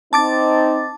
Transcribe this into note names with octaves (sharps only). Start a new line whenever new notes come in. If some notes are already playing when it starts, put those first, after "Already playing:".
C4 D#4 A5 D6 A6